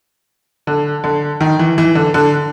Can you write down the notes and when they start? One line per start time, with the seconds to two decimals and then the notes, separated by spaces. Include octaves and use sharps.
0.67 D3
1.04 D3
1.41 D#3
1.59 E3
1.78 E3
1.95 D3
2.14 D3